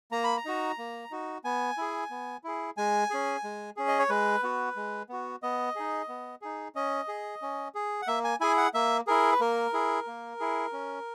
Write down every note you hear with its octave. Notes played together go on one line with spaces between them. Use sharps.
A#3 A#5
B5
A#5
D#4 F#4
A#3
D#4 F#4
B3 G#5
E4 G#4
B3
E4 G#4
G#3 G#5
C#4 G#4
G#3
C#4 G#4
D#5
C#5
G#3 B4
B3 F#4
G#3
B3 F#4
B3 D#5
D#4 G#4
B3
D#4 G#4
C#4 D#5
G#4
C#4
G#4
F#5
A#3 E5
G#5
E4 G#4 G#5
F#5
A#3 E5
E4 G#4 A#4
B4
A#3 A#4
E4 G#4
A#3
E4 G#4
C#4